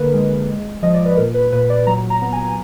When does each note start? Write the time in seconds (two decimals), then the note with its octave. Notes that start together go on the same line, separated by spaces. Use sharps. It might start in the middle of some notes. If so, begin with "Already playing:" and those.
Already playing: D3 A#3 A#4 B4
0.14 G#3
0.48 G#3
0.83 F3 D#5
0.94 D5
1.06 B4
1.17 A#2 A#4
1.34 B4
1.52 A#2 B4
1.70 D5
1.87 F#3 A#5
2.10 A#5
2.22 B3
2.33 G#5
2.48 G#5